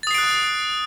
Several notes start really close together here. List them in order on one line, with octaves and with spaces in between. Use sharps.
A6 D#6 C7 D7 F#6